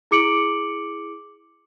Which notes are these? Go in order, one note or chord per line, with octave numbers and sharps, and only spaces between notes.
E4 G#4 D6 C#7 D7 F#7